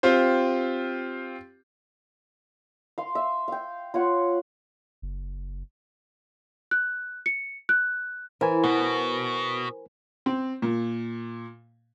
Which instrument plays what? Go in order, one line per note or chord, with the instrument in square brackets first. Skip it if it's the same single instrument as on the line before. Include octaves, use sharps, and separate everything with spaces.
[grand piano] C4 F4 G4 C5
[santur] F5 C6
E5
F5 G5
F4 C#5 F#5
[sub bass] F#1
[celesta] F#6
C#7
F#6
[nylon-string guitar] E3 [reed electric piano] A#4 C5 G#5
[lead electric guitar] B2 [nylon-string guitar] B3
[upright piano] C4
A#2